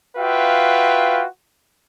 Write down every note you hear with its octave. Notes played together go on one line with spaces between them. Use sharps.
F4 F#4 B4 E5 F5 G5